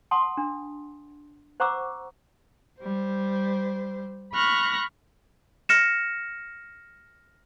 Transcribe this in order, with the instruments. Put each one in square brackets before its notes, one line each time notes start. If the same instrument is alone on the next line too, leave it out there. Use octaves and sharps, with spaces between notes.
[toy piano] F#5 A5 C6 D#6
D4
C5 F#5 A#5 C#6 D6 E6
[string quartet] G3 C5
B5 C#6 F6 F#6 A#6
[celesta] F6 A#6 C#7 E7